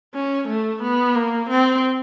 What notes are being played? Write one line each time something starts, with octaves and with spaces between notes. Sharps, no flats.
C#4
A3
B3
A#3
C4